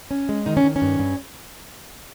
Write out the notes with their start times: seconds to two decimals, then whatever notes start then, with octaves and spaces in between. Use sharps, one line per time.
0.11 C#4
0.29 G#3
0.46 D#3 D#4
0.57 C#4
0.64 D#3
0.76 C#4
0.82 G2
0.99 G2